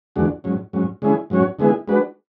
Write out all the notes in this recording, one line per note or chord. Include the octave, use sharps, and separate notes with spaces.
E2 D3 G#3 D4 F#4
G#2 F#3 C#4
G#2 F#3 C#4
D3 G#3 C#4 E4 G#4
G#2 F#3 C#4 F#4 C#5
D3 G#3 B3 E4 G#4
G#3 D4 F#4 B4